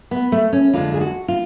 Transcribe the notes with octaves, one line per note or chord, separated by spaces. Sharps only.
B3
A3
C#4
F2 D3 G#3 F4
G#4
F#4
F4